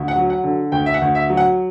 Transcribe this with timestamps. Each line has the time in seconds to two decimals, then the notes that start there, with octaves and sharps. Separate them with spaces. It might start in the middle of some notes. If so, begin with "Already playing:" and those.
Already playing: D2
0.08 F#5
0.16 F#3
0.30 F#5
0.44 D3
0.72 D2 G5
0.86 E5
0.94 F#5
1.02 D2
1.15 E5
1.30 F#3
1.37 F#5